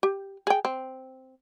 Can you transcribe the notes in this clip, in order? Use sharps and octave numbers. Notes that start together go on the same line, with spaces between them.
G4
G#4 G5
C4